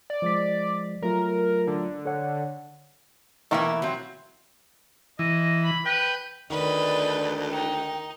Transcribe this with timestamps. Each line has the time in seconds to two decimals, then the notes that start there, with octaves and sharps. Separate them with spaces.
0.10 D5
0.22 F3 G#3 B6
1.03 F#3 A3 F4 A#4
1.67 D3
2.05 A4 C#5 F#5
3.51 B2 E3 A3 A#3 G4 E5
3.82 F#3 C4
5.19 E3 D#5
5.63 B5
5.86 B4 G5
6.50 D2 D#3 B4 D5 D#5
7.51 D#4 G5